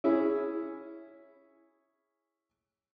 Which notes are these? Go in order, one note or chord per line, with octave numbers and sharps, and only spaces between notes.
C#4 E4 G#4